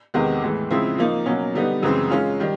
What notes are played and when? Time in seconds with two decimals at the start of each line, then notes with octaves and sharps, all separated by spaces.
0.14 E2 C3 D#3 G#3 B3
0.42 A2 E3 G#3
0.70 C#3 F3 G#3 C4 E4
0.98 F3 A#3 D#4
1.26 B2 F#3 A#3 C#4
1.55 D3 G3 B3 D#4
1.82 F#2 C#3 E3 G#3 C4
2.10 G#3 C#4 F4
2.40 D#3 G3